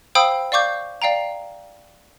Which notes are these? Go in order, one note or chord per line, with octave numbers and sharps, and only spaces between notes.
C5 F5 G5 B5 D#6 E6
D5 F5 C#6 D6 G6
D5 F5 G5 A#5